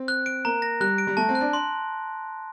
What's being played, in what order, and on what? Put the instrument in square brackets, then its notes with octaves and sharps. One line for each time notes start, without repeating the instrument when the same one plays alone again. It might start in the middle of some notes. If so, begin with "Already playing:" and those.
Already playing: [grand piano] C4
[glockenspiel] F#6
D7
[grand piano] A#3 [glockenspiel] A#5
[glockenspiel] A#6
[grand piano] G3 [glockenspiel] F#6
[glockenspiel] D7
[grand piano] G3
[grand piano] A3 [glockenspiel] A5
[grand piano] C4
[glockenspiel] F#6
[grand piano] D4
[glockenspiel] C6